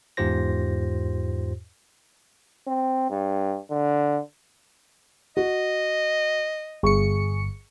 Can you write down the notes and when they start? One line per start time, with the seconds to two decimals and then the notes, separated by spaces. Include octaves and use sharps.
0.17 E2 G#2 F4 G4 C5 A#6
2.68 C4
3.10 G2
3.71 D3
5.37 F#4 D#5
6.83 G1 G#4 C#6 C#7